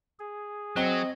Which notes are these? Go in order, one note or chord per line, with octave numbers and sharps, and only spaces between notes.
G#4
F#3 C4 D#5 G7